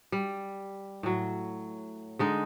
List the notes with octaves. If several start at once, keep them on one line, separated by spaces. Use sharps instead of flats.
G3
A2 F#3
D3 G#3 D#4